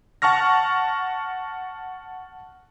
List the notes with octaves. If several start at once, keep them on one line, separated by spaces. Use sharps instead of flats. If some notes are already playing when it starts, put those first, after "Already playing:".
F#5 A5 C#6 F6 A#6